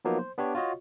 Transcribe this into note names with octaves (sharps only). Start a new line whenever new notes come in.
F3 F#3 A#3 B3 D#4
C5
B3 D4 G4 C#5
F4 F#4 C#5 D#5